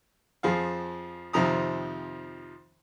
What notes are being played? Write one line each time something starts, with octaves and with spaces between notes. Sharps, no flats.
F2 F3 G#4 F5
F2 C3 D#3 F3 A#5 D#6